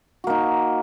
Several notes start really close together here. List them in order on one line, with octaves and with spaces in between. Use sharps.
F#4 A#3 D#4